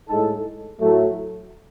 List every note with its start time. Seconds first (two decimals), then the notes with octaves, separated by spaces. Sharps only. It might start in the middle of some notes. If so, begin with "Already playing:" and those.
0.08 A2 G#3 D#4 A4
0.80 A2 F#3 A3